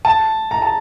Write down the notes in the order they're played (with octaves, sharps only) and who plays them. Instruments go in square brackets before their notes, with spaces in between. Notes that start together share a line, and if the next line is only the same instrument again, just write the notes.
[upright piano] A5
A#5
A5